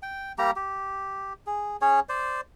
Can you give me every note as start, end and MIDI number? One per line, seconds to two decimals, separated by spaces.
0.02 0.32 79
0.38 0.51 55
0.38 0.51 58
0.38 0.51 67
0.38 0.51 82
0.56 1.33 67
1.46 1.77 68
1.81 2.00 61
1.81 2.00 68
1.81 2.00 73
2.09 2.41 72
2.09 2.41 74